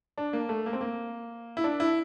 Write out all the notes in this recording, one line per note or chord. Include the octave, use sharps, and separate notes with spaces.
D4
A#3
A3
A#3
C4
A#3
E4
D4
E4